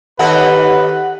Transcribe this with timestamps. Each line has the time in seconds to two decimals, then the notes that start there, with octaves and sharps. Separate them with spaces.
0.19 D#2 D#4 G4 A4 B4 F#5